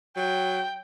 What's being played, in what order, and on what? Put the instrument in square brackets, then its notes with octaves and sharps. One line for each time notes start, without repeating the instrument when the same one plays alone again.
[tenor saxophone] F#3 [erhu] G5